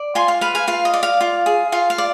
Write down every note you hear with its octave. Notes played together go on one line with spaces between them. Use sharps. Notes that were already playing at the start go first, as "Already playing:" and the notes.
Already playing: D5
F4 G#5 C6
F5
B4 F5
F5 G#5
F4 F5
D#5
D5
F5
F4
G#4
F4 F5
F5
D5